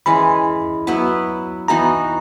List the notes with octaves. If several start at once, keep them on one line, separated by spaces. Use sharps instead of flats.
E3 G#3 C#4 B5
F#3 B3 E4 B4
E3 B3 D#4 F#4 A#5